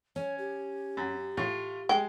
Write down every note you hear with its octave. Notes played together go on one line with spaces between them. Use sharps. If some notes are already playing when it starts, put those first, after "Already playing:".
C#4 C#5
G4
F#2
A2 F4
G#3 G5